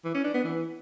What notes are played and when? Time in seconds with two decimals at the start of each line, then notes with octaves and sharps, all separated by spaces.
0.04 E3
0.14 C#4
0.24 D4
0.34 B3
0.44 E3